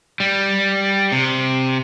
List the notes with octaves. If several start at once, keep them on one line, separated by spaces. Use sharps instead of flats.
G3
C3